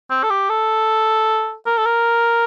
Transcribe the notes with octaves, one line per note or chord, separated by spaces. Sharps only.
C4
A4
G4
A4
A#4
A4
A#4